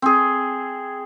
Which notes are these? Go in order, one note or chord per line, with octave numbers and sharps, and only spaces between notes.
C4 G#4